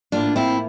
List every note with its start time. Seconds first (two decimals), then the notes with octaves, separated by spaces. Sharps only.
0.12 A2 F3 A#3 D4 F4
0.36 C4 E4